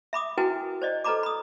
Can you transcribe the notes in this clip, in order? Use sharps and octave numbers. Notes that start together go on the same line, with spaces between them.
E5 B5 D6 D#6
E4 F#4 A#4 B4 G5 G#5
C5 D5 D#5
A4 B4 D#5 A#5 B5 D6
B5 D#6